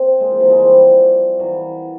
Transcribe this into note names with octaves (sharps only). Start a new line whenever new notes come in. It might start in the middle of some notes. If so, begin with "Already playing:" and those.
Already playing: C4
G#3 A#3
F3
E3 F#3
F#3 G#3
F3 G3
E3 F#3